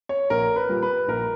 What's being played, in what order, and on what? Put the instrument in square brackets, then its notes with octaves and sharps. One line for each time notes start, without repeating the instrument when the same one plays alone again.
[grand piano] C#5
A#1 A#4
B4
A#2 G3
B4
A#1 A#4